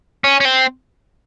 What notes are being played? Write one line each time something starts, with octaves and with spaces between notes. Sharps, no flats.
C#4
C#4
C4